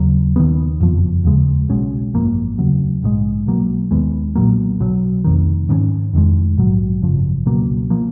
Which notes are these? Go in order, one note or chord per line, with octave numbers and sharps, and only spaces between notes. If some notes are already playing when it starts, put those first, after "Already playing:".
Already playing: D#2 C#3 F#3
D#2 D#3 G#3 B3
F#1 F2 F3
D#2 C#3 G#3
B1 B2 G#3 C#4
G#1 F#2 F3 A#3
F1 D#2 C#3 F#3
A#1 G#2 F3 G#3
B1 B2 F#3 A#3
D#2 D#3 G#3 B3
B1 A#2 F#3 A#3
B1 B2 F#3
F1 F2 D#3
G#2 D#3 A#3 C#4
F1 F2 D#3 G#3
A#1 G#2 F#3
G#1 F#2 C#3 F3
C#2 B2 F#3 A#3
F3 A#3